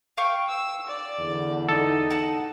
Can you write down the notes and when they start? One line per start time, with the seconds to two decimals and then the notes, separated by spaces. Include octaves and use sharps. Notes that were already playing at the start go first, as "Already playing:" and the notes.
0.17 F5 G5 C#6
0.49 E6
0.87 D5
1.19 E2 D3
1.69 D#4 A4
2.10 F#5 A5